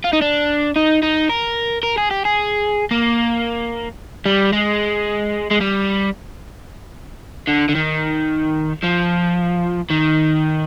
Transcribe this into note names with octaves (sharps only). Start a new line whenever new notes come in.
F4
D#4
D4
D#4
D#4
A#4
A#4
G#4
G4
G#4
A#3
G3
G#3
G#3
G3
D3
D3
D#3
F3
D#3